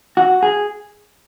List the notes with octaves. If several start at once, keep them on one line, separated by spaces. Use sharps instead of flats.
F#4
G#4